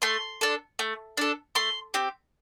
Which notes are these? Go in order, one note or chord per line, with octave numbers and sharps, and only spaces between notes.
A3 C6
D4 A4
A3
D4 A4
A3 C6
C4 G4